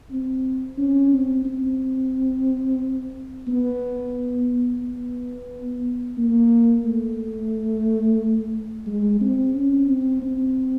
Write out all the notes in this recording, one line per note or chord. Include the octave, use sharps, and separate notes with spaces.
C4
C#4
C4
C4
B3
B3
A#3
A3
G#3
C4
C#4
C4
C4